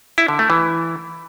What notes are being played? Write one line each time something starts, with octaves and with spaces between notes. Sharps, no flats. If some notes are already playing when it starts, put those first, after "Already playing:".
E4
D3
A3
E3